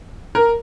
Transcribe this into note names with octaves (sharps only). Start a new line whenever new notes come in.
A#4